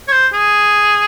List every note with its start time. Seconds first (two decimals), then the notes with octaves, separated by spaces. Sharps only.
0.08 C#5
0.12 C5
0.33 G#4